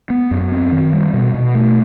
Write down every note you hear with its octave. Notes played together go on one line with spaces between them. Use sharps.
B3
F#2
C4
D#3
G3
B2
B2
A3